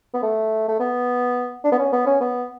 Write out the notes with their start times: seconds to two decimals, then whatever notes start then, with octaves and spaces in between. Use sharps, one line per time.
0.14 B3
0.23 A3
0.68 A3
0.80 B3
1.64 D4
1.72 B3
1.79 C#4
1.93 B3
2.07 C#4
2.21 B3